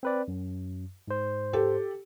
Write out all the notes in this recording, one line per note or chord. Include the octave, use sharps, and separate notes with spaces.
C4 B4 D5
F#2
G#2 C5
G4 A4